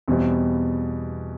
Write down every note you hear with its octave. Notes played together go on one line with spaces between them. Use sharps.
E2 B2 G3 C4